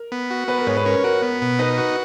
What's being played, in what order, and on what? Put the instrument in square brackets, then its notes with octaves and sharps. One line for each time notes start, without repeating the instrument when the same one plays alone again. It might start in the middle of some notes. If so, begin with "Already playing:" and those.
Already playing: [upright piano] A#4
[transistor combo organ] B3
F#4
[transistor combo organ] B3 [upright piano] B4
[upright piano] A#4
[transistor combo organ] G#2 [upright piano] C#5
[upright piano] B4
[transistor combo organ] C#4 [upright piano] A#4
[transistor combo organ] F#4 [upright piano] A#4
[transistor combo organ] B3
B2
[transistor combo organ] D#4 [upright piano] B4
[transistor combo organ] F#4